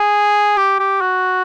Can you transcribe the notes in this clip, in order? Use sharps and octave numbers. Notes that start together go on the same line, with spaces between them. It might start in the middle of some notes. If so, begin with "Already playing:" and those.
Already playing: G#4
G4
G4
F#4